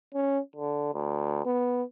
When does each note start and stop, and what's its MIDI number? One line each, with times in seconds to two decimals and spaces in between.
0.14 0.40 61
0.56 0.89 50
0.94 1.41 38
1.45 1.83 59